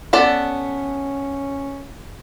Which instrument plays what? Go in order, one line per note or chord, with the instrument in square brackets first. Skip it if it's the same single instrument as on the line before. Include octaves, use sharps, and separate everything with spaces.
[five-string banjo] B3 A4 D5 [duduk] C#4